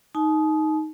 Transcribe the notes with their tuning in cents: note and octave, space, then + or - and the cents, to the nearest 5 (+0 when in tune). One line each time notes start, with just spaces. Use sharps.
D#4 +5 A5 -45